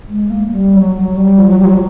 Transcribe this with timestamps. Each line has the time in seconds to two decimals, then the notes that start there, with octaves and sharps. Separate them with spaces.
0.09 G#3
0.30 A#3
0.51 G3
0.74 F#3
0.95 F#3
1.16 G3
1.38 F3
1.48 F#3
1.59 G3
1.65 F3
1.70 F#3